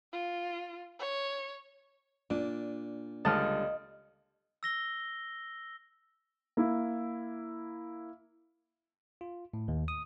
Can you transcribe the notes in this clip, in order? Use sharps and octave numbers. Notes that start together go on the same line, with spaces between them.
F4
C#5
A#2 D4
C#2 D3 G3 D#5 A5 F6
E6 A#6 G7
A#3 E4
F4
A2
D#2
D#6